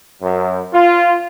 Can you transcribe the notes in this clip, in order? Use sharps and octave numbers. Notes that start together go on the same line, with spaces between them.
F#2
F4